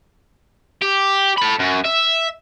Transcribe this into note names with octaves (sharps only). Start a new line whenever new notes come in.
G4
A4 B5
F#2
E5